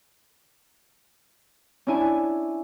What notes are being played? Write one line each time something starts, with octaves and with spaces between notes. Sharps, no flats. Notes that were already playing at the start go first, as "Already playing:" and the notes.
C#4 D4 E4 G#5